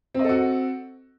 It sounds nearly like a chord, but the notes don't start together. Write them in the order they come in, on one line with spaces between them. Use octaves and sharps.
C4 D#5 A4 F#4